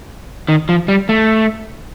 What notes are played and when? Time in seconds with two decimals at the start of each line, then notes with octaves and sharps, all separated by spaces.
0.48 D#3
0.69 F3
0.88 G3
1.09 A3